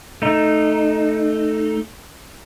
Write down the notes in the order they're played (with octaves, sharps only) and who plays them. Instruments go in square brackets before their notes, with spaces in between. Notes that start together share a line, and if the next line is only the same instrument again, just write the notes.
[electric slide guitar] A3 D#4